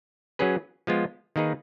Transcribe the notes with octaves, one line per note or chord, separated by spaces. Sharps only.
F#3 C#4 G#4 B4
F3 G#3 B3 F4
D#3 A#3 D#4 G#4 B4